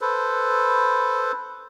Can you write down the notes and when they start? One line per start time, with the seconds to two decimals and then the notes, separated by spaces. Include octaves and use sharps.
0.01 A4 B4 C5